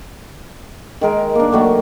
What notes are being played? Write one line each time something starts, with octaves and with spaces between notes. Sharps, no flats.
D#3 G#3 A#4
A#3 D4
D#3 F#3 A3